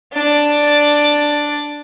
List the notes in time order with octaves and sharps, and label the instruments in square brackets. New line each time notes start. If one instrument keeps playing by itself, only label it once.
[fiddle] D4 D5